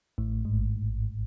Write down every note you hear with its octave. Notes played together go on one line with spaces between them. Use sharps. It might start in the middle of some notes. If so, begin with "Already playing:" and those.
A1 A2
G#1 G#2